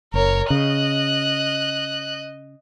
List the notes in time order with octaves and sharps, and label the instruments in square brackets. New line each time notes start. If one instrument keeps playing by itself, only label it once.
[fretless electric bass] F#1 [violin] A#4 C#5
[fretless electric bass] C#3 [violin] D#5 F#6